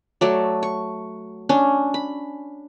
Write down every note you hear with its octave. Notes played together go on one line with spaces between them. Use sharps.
F#3 A3 D5
C#6
C#4 D4
B5